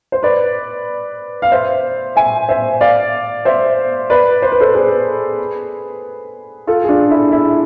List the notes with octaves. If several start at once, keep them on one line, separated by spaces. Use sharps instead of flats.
C5
B4 D5
F5
C5 E5
E5 G#5
C5 E5
D5 F5
C5 E5
B4 D5
C5
B4
A4 C5
G#4 B4
F4 A4
G#4
D4 F4
E4
E4